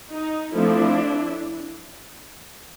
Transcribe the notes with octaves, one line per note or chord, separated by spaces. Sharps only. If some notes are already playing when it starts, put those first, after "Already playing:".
D#4
F3 A3 C4 D4 E4